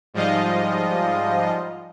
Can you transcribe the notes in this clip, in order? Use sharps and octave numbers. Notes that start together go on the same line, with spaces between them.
G#2 F3 G3 F4 D#5